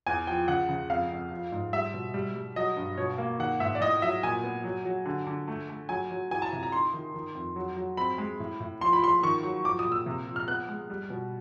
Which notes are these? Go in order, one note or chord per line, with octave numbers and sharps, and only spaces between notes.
E2 G#5
F3 G5
C#3 F#5
C#3
F2 F5
F2
F3
G#2
G3 E5
B2
G3
G3
F#3 D#5
G2
B2 C#5
A#3
D#3 F#5
G#2 E5
D5
A2 D#5
F#3 E5
A#2 G#5
B3
F#3
F#3
D3
D3
A3
A3
F#3 G#5
F#3
E3 G#5
A5
C3 A#5
A#5
D#4 C6
D#3
D#3
F2
F#3
F#3
C4 B5
G#3
A2
A2
F3 C6
B5
F3 C6
D#3 C#6
F#3
F3 D6
D#6
A#2
E6
C3
F3
F6
B3 F#6
G#3
G3
B2